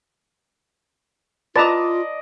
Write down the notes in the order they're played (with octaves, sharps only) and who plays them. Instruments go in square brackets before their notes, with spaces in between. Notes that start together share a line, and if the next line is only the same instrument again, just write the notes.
[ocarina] F4 [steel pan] B4 A5 A#5 [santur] D5 D#5 [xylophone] D6 A6